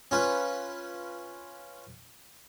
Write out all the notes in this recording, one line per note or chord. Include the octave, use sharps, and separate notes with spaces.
C#4 F4 B4